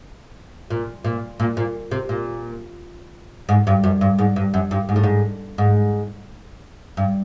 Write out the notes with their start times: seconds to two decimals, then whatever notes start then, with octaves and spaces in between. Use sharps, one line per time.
0.70 A#2
1.05 A#2
1.40 A#2
1.57 A#2
1.91 C3
2.09 A#2
3.49 G#2
3.67 G2
3.84 F#2
4.01 G2
4.19 G#2
4.36 G2
4.54 F#2
4.71 G2
4.89 G#2
4.96 A2
5.04 G#2
5.58 G#2
6.97 G2